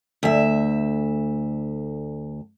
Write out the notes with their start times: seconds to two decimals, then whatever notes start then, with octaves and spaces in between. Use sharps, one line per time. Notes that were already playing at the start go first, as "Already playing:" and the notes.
0.23 D2 E5